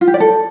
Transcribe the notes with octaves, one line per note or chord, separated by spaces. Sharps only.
F4
G4
D5
A4